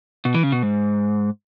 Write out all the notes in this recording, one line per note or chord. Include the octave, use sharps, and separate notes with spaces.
B2
E3
C#3
B2
G#2